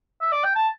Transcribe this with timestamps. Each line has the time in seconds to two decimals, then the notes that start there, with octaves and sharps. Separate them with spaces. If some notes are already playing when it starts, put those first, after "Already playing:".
0.21 E5
0.32 D5
0.44 G5
0.55 A5